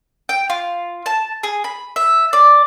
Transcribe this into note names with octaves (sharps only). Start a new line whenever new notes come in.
G5
F4
A5
G#4
B5
E5
D5